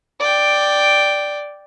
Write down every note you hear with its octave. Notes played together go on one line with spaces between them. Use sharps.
D5 G5